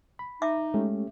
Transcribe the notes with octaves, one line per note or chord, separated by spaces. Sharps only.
B5
D#4 E5 D6
G#3 A3 C#4 G4